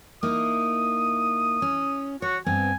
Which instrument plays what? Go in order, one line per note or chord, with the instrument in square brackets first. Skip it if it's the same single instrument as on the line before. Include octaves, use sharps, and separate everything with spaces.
[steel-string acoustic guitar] A#3 D#4 E4 [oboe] D#6
[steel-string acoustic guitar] C#4
[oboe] F#4 [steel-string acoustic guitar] C#5
[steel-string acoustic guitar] G2 B3 C4 [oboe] G#5